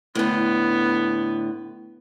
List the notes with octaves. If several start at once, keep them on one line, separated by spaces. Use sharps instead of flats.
A2 D3 B3